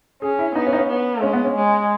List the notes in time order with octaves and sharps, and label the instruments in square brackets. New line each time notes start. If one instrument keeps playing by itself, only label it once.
[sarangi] C#4 [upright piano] G#4
[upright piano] E4
[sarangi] B3 [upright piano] D#4
[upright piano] C#4
D#4
C#4
[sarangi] B3
[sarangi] G#3 [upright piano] C#4
[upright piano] B3
C#4
[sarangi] G#3